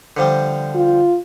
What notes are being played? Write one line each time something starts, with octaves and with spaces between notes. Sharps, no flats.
D3 F3 G3
F4